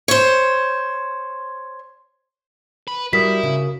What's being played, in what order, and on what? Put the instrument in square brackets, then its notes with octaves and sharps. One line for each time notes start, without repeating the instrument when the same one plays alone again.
[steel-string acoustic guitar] C5 C#5
[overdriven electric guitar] B4
[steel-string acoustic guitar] G3 [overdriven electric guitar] E4 [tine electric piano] F#4 A#4 D#6 [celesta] B6
[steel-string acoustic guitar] C#3